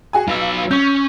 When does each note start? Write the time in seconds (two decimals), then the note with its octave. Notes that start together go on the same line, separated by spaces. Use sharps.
0.13 F#4 G#4 G#5
0.28 F#3 F4 B4 E6
0.71 C#4 C#6 G6